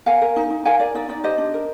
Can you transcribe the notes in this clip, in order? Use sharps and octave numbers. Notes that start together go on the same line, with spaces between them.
A#4 F5 G#5
A#4
D#4
D#4
A#4 F5 G#5
A#4 D5
D#4 D5
D#4 D5
G4 C5 D#5
D4
A#4